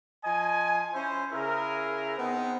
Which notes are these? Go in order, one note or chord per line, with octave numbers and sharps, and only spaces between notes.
F3 D#5 G#5
C#4 E4 C5
C#3 E4 G#4 A#4
B3 C4 D#4 G#4 B4